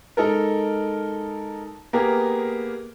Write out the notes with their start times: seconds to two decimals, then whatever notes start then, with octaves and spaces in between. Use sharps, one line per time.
0.17 G#3 D#4 A4 A#4
1.93 A#3 B3 G4 G#4 A#4